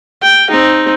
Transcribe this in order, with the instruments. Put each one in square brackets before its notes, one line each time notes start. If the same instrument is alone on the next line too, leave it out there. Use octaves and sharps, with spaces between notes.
[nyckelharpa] G5
C4 D#4